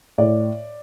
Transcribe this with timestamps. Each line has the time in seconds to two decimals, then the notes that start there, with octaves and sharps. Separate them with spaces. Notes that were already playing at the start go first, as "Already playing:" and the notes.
0.18 A2 D5